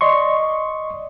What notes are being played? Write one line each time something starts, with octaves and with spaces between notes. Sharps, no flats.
D5 D#5 C6 C#6